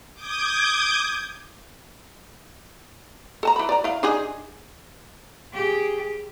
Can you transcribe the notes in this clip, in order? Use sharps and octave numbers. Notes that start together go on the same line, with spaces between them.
D6 D#6 G6 G#6
A4 A5 A#5
E3 B5
D5 A#5
E4 F5
D4 D#4 G#4
G4 G#4